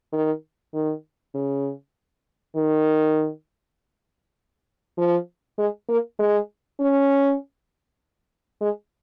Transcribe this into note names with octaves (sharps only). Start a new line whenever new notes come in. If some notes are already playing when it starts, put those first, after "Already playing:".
D#3
D#3
C#3
D#3
F3
G#3
A#3
G#3
C#4
G#3